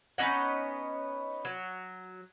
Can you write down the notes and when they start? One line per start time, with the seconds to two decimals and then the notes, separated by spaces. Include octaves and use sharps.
0.18 B3 C#4 D#4 F#5
1.45 F#3